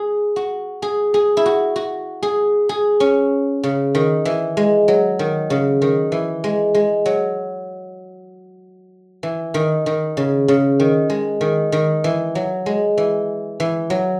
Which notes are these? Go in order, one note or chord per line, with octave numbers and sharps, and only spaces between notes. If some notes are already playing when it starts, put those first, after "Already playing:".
Already playing: G#4
F#4
G#4
G#4
E4
F#4
F#4
G#4
G#4
C#4
C#3
D#3
E3
G#3
F#3
D#3
C#3
D#3
E3
G#3
G#3
F#3
E3
D#3
D#3
C#3
C#3
D#3
G#3
D#3
D#3
E3
F#3
G#3
E3
E3
F#3